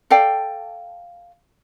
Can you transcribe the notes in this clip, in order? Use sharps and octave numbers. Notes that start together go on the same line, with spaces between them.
A4 D5 F5 G5